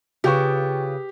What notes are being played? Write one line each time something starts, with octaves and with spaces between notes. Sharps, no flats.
C#3 F4 G4 G#4 B4 G5 C#6